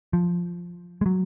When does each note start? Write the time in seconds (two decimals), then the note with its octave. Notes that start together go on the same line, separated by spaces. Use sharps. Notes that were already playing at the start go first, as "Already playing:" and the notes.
0.13 F3
1.01 G#3
1.06 F#3